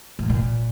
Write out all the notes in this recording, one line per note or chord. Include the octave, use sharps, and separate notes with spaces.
A2
A#2